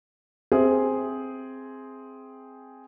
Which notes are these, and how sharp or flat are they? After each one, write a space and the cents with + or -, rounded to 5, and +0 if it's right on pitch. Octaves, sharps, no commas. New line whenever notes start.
C4 +0 G#4 +5 E5 +0